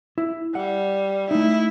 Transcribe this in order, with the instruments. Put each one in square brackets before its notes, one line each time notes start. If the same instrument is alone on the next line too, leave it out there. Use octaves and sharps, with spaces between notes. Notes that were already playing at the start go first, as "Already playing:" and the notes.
[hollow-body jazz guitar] E4
[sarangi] G3 [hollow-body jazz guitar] F#5
[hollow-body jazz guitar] A3 D#4 [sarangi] E4